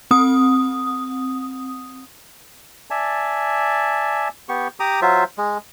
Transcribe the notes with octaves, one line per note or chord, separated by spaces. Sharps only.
C4 D#6
D5 E5 G#5 A5
B3 G4 C#6
G4 A#5 D6 D#6
F#3 F4 C5 E5
G#3